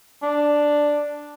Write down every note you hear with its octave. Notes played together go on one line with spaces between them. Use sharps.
D4